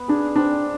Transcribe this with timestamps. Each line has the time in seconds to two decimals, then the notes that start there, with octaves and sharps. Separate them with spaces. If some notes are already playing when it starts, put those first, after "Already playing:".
Already playing: B3 B4
0.08 D4 G#4
0.36 C4 D4